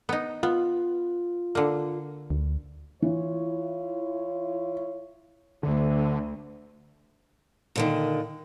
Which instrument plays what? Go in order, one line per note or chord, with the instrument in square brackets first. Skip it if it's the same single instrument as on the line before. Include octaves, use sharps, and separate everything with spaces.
[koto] B3 D#4
[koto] B3 [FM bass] F4
[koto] D3 A#3
[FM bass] D2
[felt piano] E3 [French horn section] E4 F4 C#5
[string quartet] D2 [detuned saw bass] D3
[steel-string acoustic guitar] A#2 D3 D#3